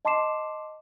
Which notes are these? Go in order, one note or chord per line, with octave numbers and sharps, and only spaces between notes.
D#5 A5 C6 D6 C7 E7